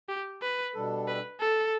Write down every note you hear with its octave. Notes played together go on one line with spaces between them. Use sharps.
G4
B4
B2 G3 D4 A4
B4
A4